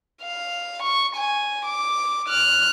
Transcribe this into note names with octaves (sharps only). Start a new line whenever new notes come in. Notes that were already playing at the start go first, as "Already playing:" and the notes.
F5
C#6
G#5
D6
F6 F#6